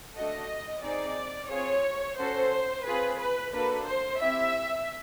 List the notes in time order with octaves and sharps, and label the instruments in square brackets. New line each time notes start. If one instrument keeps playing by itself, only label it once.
[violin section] A3 D4 F#4 A4 D#5
C4 D#4 G#4 D5
C4 F4 G#4 C#5
C#4 F#4 A4 C5
C4 F4 G#4 B4
B4
A#3 D4 F#4 A4 B4
C5
C4 E4 G4 E5